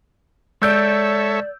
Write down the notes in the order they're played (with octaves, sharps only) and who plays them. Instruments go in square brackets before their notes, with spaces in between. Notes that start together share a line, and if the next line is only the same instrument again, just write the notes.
[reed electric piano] G#3 [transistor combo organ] A4 C#5 E5 [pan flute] D5 [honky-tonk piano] E6 G6 D7